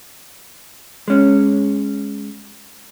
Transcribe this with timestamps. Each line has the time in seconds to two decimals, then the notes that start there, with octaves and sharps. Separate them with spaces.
1.08 G#3 C#4